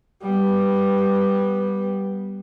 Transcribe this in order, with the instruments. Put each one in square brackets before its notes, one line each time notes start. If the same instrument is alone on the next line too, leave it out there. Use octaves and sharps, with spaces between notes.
[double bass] G3 B3